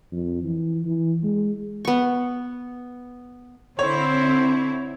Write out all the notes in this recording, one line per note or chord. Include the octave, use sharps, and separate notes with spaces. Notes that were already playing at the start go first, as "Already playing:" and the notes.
F2
E3
E3
G#3
B3 C#6
D3 C4 E4 C5 C#5